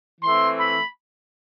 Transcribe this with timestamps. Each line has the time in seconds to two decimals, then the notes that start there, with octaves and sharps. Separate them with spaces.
0.21 E3 A3 C4 C6
0.60 B5